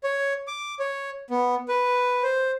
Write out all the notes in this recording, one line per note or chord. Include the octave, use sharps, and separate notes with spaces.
C#5
D6
C#5
B3
B4
C5